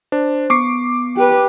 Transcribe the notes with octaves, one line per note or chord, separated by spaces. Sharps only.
D4 C5
B3 C#6 D6 C7
G4 B4